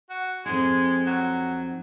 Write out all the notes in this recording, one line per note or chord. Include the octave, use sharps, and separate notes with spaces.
F#4
F2 G#3 D#4
F#3